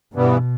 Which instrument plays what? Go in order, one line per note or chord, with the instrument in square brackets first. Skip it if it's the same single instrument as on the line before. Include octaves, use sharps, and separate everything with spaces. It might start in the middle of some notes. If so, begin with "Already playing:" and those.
[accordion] G2 E3 G3 B3 [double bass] B2